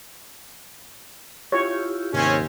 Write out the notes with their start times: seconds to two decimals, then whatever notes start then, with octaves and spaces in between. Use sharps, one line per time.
1.52 E4 F4 G4 C#5
2.13 D#2 G#2 C3 C4 C#4